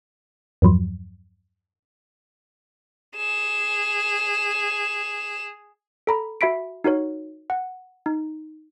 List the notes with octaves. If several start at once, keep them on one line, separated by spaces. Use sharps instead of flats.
E2 G2 F3 F#3
G#4 E7
A4 A#5 B5
F#4 E5 B5 B6 D7
D#4 F#4 A#4 C#5
F#5
D#4